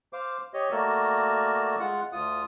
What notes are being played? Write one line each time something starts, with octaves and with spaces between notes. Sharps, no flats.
C5 F5 D6
G4 C#5 D#5
A3 A#3 F#4 A#4 D5 E6
G#3 F4 F#5
D2 F4 D#6